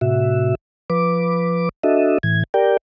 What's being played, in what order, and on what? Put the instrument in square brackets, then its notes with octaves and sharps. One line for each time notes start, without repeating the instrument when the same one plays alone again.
[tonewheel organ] A2 C3 F#4 E5
F3 B4 D6
D4 F#4 A4 D#5 E5
A2 E3 G#6
G4 A#4 D5 G5